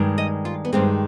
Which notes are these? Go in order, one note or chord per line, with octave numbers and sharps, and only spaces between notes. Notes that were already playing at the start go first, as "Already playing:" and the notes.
Already playing: G2 D#3 G#3
D#5
F4
B3
G2 D#3 G#3 C4